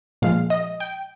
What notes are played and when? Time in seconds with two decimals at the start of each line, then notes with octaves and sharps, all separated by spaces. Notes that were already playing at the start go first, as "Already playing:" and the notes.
0.22 A#2 F3 G#3 F5
0.50 D#5
0.80 G5